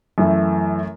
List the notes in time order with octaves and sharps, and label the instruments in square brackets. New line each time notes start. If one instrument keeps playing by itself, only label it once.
[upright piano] F#2 E3 A3 E4